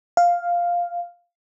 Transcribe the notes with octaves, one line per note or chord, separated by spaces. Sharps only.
F5